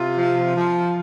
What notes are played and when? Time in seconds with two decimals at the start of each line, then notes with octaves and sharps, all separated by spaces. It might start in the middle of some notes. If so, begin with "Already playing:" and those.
Already playing: C3 F4
0.17 F3
0.56 F3